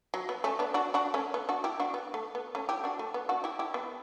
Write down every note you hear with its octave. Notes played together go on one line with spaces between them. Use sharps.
F#3
B3
A3 C#4
B3 D4
D4 F#4
D4 F#4
A3 C#4
B3
D4 F#4
E4 G4
D4 F#4
B3
A3
B3
A3 C#4
E4 G4
D4 F#4
A3
B3
D4 F#4
E4 G4
E4 G4
B3